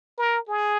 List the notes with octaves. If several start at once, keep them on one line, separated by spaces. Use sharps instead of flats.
A#4
G#4